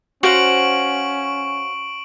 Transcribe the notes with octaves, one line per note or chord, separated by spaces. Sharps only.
C#4 F#4 C5 F5 C#6 D7 F#7